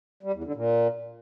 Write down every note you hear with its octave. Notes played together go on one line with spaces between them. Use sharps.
G3
E2
D3
A#2